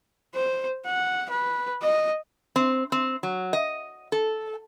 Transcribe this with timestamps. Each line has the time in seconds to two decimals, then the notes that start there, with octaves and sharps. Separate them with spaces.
0.35 C5
0.86 F#5
1.30 B4
1.82 D#5
2.56 C4
2.92 C4
3.23 F#3
3.53 D#5
4.12 A4